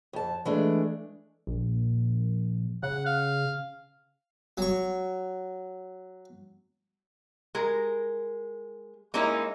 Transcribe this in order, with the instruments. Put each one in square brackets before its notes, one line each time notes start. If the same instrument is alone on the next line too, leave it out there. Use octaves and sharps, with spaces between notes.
[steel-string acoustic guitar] F2 A5
E3 G#3 A3 D4
[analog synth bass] A#1
[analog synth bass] C#3 [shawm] F#5
[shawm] F5
[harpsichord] F#3 C#6
[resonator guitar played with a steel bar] G#3 A#4
G#3 A#3 C#4 D#4 E4